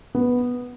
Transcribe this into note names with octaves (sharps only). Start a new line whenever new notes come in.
B3